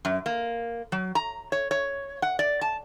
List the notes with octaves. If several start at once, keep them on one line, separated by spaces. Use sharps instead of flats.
F#2
A#3
F#3
A#5
C#5
C#5
F#5
D5
A5